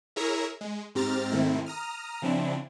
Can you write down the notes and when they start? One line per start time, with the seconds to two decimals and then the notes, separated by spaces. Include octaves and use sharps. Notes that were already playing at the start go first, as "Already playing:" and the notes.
0.16 E4 G#4 A#4 C#5 E5 A#5
0.61 G#3
0.95 G#2 C4 G4 A#5 F6 A6
1.32 G#2 C3 D#3 A3 C4 E4
1.66 A#5 D#6 F6
2.22 C#3 F3 C4 D4 E4